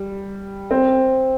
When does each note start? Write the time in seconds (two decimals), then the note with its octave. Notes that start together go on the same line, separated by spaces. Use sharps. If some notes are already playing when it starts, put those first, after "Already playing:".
Already playing: G3
0.71 C4